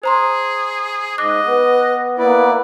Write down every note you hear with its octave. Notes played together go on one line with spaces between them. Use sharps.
G#4 C5 A#5 C6
G#2 D#5 D6 F#6
B3 B4
A#3 B3 E4 B4 D5